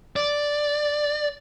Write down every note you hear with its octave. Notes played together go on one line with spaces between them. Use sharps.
D5